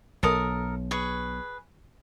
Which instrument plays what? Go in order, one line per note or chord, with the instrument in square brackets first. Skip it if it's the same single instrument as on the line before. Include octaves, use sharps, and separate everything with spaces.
[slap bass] B1 [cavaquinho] A4 A#4 D#6
[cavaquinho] G#4 B4 C#6